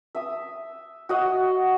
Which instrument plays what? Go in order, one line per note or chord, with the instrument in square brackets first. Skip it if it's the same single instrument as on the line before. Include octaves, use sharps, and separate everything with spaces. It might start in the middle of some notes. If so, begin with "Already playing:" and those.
[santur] E5 D#6
F#4 D#5 F#5